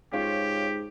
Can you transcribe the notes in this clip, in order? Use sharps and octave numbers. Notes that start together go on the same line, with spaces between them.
G#2 C#4 F4 G4 C#5